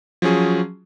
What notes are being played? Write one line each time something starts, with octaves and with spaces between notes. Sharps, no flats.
F3 F#3 C#4 G#4